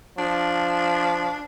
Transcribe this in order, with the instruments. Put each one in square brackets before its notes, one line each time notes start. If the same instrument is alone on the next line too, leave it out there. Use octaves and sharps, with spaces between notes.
[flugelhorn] F3 [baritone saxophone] D4